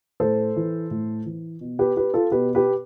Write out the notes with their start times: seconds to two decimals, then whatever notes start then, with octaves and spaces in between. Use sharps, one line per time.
0.20 A2 A4 C5
0.56 E3
0.91 A2
1.25 E3
1.61 B2
1.79 G4 B4
1.97 G4 B4
2.14 F4 A4
2.31 B2 G4 B4
2.55 G4 B4